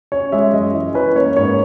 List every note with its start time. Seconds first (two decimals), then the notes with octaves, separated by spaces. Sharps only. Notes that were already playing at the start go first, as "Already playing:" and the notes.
0.12 C#4 C#5
0.32 G#3 E5
0.53 F#2 D#5
0.74 E3
0.94 C#4 B4
1.15 A#3 C#5
1.36 G#2 C#5